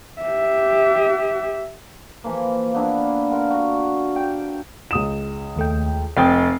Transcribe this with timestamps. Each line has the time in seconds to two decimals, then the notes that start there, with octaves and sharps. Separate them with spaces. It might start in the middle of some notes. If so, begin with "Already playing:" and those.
0.22 G4 E5
2.24 E3 F3 A#3
2.74 A#3 B3 D4 E4
3.31 F4 A#4 F#5
3.50 F#4
4.16 G5
4.91 C#2 D#6 E7
5.56 D#2 A3 G5
6.17 F1 C4 D#5 G5 D#6 A6 C7